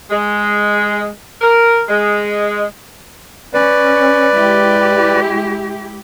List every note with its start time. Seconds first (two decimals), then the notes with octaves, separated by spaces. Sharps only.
0.11 G#3
1.42 A#4
1.88 G#3
3.54 C#4 B4 D5
4.33 G#3 E4 G4